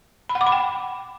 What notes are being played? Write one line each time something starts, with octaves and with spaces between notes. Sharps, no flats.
B5
F#5
D6
B5
G5